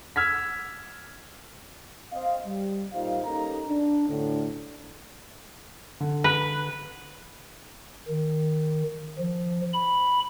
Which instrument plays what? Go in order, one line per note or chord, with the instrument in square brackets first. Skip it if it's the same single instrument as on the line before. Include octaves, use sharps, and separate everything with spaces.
[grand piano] E6 F6 G#6 B6
[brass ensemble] C4 D#5 F5
G3
A#2 G3 D#4 F4 C5 F5
A#3 C#4 D#4 G4 A4 A#5
D4
D2 A2 D3
[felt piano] D3
[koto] B4
[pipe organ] D#3
F3
B5